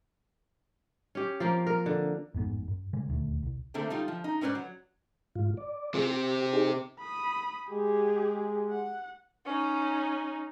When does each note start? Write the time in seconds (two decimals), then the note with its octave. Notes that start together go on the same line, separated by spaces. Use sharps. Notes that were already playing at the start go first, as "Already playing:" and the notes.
1.15 C#4 G4
1.40 F3 A#3 C4
1.67 A#4
1.86 D3
2.35 A1 F2 G#2 B3
2.68 F#2
2.93 C#3 G3 G#3
3.09 D#1 D2
3.43 C2
3.74 D3 A3 A#3 C4 D4
3.90 G3 D#4 F4
4.08 F3
4.24 D#4
4.41 G#2 C#4 B4 C5 D5
4.55 F#3
5.36 G#2 F4
5.57 D5
5.94 C3 C4 F4 G#4
6.13 G4
6.53 D#4 G4 G#4
6.99 B5 D#6
7.71 G#3 G4 G#4
8.71 F#5
9.45 C#4 D#4